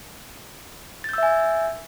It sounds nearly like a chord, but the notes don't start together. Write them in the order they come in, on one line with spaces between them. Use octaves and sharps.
A6 G6 E6 E5 G#5